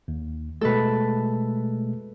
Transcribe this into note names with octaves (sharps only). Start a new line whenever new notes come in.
D#2
B2 G#3 A3 A4 B4